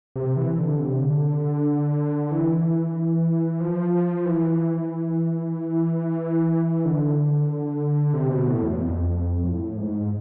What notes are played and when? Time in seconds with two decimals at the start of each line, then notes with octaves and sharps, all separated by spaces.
0.16 C3
0.37 E3
0.59 D3
0.79 C3
1.01 D3
2.31 E3
3.60 F3
4.25 E3
6.85 D3
8.13 C3
8.30 B2
8.47 A2
8.63 E2
8.79 F2
9.44 A2
9.76 G#2